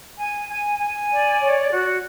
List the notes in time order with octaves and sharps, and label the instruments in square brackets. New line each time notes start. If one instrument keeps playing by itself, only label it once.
[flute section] G#5
G#5
G#5
D5
C#5
F#4